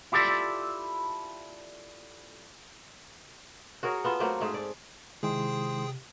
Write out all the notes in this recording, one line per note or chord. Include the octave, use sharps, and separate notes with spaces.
E4 F4 G4 A4 D5
F#4 G#4 A#4 C#5
B3 F4 A4
F#3 A3 A#3 C4
G#2 A3 G#4
D5
C3 D#3 G#3 E4 G#4 C5 G5 D#6